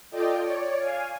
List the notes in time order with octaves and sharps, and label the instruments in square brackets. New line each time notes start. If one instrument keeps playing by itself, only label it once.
[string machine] F4 A4 D5 D#5 G5
C#5 D5
F5 G#5